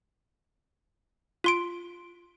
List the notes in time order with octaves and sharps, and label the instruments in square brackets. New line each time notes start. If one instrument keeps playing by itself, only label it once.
[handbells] F4 C6 D7